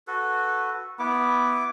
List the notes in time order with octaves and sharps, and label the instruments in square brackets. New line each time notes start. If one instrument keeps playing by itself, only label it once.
[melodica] F#4 A4 B4
[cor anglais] B3 [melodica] E4 D6